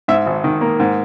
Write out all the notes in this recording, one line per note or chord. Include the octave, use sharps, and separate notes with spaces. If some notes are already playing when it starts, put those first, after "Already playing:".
G#2 E5
G#1
D#3
A#3
G#2